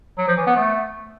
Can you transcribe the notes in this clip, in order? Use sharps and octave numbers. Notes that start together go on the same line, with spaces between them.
F#3
F3
E3
B3
A3